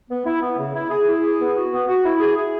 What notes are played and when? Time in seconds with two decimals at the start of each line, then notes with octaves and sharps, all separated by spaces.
0.09 B3
0.25 E4
0.41 B3
0.57 C#3
0.74 E4
0.90 G#4
1.06 E4
1.23 G#4
1.38 B3
1.54 F#4
1.71 B3
1.88 F#4
2.04 E4
2.20 G#4
2.36 G#4